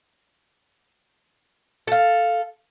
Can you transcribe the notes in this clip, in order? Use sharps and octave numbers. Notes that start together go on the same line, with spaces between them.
A4 F5